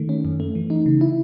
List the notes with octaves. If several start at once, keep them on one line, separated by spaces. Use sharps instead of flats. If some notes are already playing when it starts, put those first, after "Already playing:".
Already playing: D#3 A3
C#4
F#2
A3
E3
D#4
C#3
E4